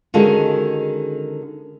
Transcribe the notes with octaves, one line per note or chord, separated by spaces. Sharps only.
D3 D#3 G#3 C#4 F#4